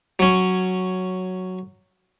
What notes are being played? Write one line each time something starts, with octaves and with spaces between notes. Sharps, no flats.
F#3 C#4